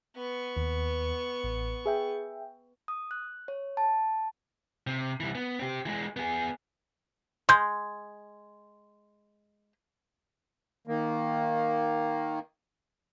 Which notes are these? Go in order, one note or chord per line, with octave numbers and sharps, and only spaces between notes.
B3 C#6
D#2
A1
G#4 E5 G5
D#6
F#6
C#5
A5
C3
C2 E3
B3
C4 G4
E3 G#3
B3 G#4
G#3 C6 G6
D#3 A#3